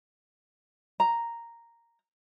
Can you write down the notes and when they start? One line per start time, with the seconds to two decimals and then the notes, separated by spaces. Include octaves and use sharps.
1.00 A#5